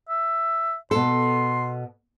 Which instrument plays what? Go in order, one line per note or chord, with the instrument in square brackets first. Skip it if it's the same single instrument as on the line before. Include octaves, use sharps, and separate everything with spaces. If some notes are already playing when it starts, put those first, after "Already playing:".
[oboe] E5
[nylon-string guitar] B2 A4 [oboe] C6